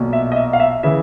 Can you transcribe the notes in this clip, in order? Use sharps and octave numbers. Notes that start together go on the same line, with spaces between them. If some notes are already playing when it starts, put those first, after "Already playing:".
Already playing: B1 A#2
E5
D#5
E5
F5
E5
C#3 E3 E5